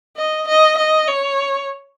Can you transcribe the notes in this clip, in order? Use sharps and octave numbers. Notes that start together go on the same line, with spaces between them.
D#5
D#5
D#5
C#5